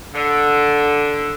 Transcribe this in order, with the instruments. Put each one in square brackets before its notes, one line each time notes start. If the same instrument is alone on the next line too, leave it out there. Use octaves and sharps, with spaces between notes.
[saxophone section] D3